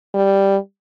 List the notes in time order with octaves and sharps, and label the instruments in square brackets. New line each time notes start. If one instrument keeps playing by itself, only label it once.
[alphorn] G3